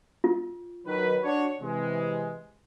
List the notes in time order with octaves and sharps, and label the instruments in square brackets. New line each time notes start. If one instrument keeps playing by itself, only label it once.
[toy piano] F4
[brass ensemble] D#3 F#3 B4
D4 F#4 C#5
C3 E3 G#3